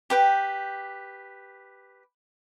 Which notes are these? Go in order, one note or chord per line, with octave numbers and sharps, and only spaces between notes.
G4 B4 G5